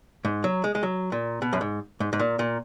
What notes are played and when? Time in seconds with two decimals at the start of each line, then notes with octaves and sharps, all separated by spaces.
0.25 G#2
0.44 F#3
0.64 G#3
0.75 G#3
0.83 F#3
1.12 A#2
1.42 B2
1.53 F#2
1.61 G#2
2.00 G#2
2.13 G#2
2.20 A#2
2.39 A#2